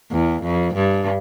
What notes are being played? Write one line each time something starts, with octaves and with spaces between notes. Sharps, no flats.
E2
F2
G2